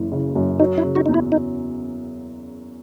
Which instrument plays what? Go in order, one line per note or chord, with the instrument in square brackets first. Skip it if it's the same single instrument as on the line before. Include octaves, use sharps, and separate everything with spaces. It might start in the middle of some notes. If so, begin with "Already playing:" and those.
Already playing: [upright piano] F#1 F#2 E3
C#3
F#2
[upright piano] F#3 [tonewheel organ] D#4
[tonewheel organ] E4
[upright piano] C#3
[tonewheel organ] D#4 F#4
[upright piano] E2 [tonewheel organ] D#4
[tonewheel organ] E4
D#4